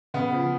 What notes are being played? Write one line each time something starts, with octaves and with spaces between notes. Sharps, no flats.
C#3 B3
F3